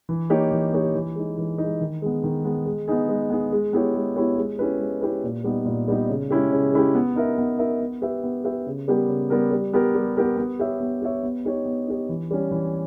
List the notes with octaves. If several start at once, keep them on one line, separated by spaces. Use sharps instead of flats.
E3
A#3 D#4 G4 C#5
E3
A#3 D#4 G4 C#5
E3
G#3 D#4
E3
D#4
G#3
D#3
G#3 B3
D#3
G#3 B3
G#3
B3 D#4 G#4
G#3
B3 D#4 G#4
G#3
B3 E4 G4 C#5
G#3
B3 E4 G4 C#5
G#3
C#4 E4 G4 B4
G#3
C#4 E4 G4 B4
A#2
G3 B3 D#4
A#2
G3 B3 D#4
C#3
G#3 C#4 E4 G4
C#3
G#3 C#4 E4 G4
B3
D#4 A#4 E5
B3
D#4 A#4 E5
B3
G4 B4 E5
B3
G4 B4 E5
C#3
G3 B3 G4 A#4
C#3
G3 B3 G4 A#4
G3
B3 G4 A#4
G3
B3 G4 A#4
B3
G4 C#5 E5
B3
G4 C#5 E5
B3
D#4 G4 C#5
B3
D#4 G4 C#5
E3
G3 C#4
E3